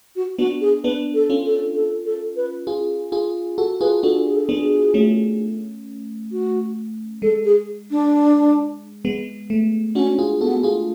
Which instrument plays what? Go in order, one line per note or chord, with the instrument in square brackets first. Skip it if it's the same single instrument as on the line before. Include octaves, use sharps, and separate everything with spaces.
[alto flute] F#4
[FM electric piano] B3 D4 [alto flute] F#4
[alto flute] G#4
[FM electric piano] B3 D4 [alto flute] B4
[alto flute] A4
[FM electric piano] C#4 F4
[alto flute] A4
A4
A4
B4
[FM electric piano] F4 G#4
F4 G#4
F#4 A4
[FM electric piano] F4 G#4 [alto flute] B4
[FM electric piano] D4 F#4 [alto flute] A4
[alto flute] G#4
A4
[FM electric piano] B3 D4 [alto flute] G#4
[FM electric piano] A3 C#4
[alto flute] F#4
[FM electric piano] G#3 [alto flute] A4
[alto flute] G#4
D4
[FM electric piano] G#3 B3
A3
[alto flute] C#4 [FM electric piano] D4 F#4
[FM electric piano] F4 G#4
[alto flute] B3 [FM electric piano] F#4 A4
[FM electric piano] F4 G#4